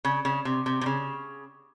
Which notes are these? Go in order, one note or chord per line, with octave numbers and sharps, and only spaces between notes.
C#3
C#3
C3
C3
C3
C#3